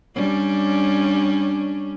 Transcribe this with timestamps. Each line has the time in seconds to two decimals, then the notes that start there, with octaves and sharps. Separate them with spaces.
0.15 G3 C#4 D4